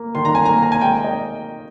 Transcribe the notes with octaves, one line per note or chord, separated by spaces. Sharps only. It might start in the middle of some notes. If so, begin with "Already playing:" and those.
Already playing: A#3
D#3 C6
A#5
G#5
A#3 A#5
A#5
G#5
G#3 G5
D#5